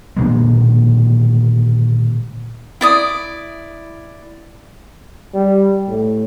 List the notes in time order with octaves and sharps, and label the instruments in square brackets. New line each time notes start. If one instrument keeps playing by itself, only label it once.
[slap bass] A#2 D3 D#3 G#3
[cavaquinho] E4 D5 D#6
[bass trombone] G3
A2